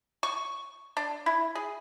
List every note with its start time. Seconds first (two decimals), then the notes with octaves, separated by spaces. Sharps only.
0.23 C#6
0.97 D4
1.26 E4
1.55 G#4